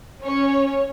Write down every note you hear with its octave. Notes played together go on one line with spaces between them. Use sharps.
C#4 C#5